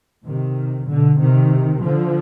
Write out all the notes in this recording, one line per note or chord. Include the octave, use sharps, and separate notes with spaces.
C3 D#3
B2 D3
C3 D#3
D3 F3